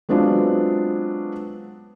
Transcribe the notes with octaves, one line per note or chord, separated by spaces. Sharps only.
F#3 G#3 B3 C4 D4 F4